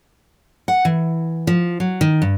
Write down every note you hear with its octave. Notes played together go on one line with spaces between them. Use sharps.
F#5
E3
F3
F#3
D#3
G2